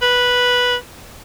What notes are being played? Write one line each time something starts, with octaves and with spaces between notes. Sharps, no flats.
B4